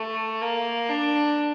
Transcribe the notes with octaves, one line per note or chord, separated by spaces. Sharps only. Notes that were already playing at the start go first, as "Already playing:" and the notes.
Already playing: A3
A#3
D4